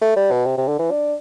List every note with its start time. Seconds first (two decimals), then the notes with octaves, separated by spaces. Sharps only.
0.01 A3
0.16 G3
0.31 B2
0.46 C3
0.57 C3
0.68 D3
0.79 E3
0.91 D4